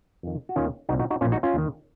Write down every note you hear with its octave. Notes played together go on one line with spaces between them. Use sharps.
F2 D#3
F#4
D#2 D#3 C#4 F4
C2 A#2 D#4 F#4
D#4 F#4
D#4 F#4
A#1 A#2 C#4 F4
D#4 F#4
C#4 F4
D#2 D#3